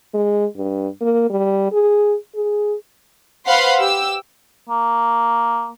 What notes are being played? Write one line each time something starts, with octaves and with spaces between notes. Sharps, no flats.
G#3
G2
A#3
G3
G#4
G#4
B4 C5 F5 F#5 B5 C6
G4 E6
A#3